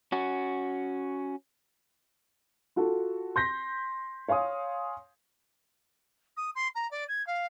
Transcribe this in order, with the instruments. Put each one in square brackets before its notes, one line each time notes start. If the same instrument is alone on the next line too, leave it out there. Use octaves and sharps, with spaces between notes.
[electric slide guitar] C#4 F#4
[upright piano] F4 F#4 A4
C6 G6 A#6 B6
C#5 F5 G#5 C6 D#6
[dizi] D#6
C6
A#5
D5
G#6
F5